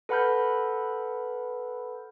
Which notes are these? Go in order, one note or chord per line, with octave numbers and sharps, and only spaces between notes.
A4 B4 F#5 B5 F6 G6